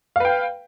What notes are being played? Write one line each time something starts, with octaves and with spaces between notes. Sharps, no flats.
B4 F5 G5